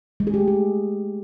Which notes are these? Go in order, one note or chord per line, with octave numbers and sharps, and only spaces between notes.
G#3
G#4
G4
A3
G#4